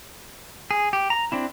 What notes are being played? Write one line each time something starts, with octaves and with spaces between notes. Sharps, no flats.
G#4
G4
A#5
C4 D4 E4